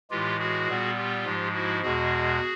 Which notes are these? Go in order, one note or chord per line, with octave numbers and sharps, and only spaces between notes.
A2 E3 G#3 F4 G4
F#4 G#4
A#2 G3 B3
F4 G4
G#2 F3 G#3
E4 F#4
E2 B2 G#3 F#4 G#4